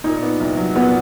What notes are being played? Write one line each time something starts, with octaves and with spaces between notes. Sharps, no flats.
A#2 D#4
B3
C2
F#3
A#2 B3